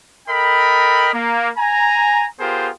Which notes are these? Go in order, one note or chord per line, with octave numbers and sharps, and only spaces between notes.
A4 A#4 D#5 G5 B5
A#3
G#5 A#5
B3 F4 G4 G#4 A#4 C5